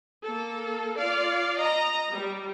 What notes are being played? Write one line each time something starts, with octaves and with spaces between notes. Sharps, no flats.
A#3 A4
F4 D5 F5
D#5 A#5
G3